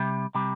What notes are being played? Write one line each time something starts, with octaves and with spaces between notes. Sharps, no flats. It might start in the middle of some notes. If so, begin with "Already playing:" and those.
Already playing: C3 G3
C3 G3